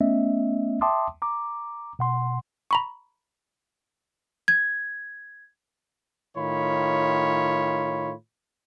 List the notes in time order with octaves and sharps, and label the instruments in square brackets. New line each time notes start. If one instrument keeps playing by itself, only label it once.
[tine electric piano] A3 B3 C#4 D#5 E5
E5 G5 A5 C6 D6 D#6
A#5 D6
B2 F#5 C6
[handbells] A#5 B5 C#6
[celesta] G#6
[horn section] A2 D#3 F4 C#5 B5